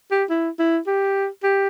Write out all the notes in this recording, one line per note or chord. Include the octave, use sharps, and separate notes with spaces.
G4
E4
E4
G4
G4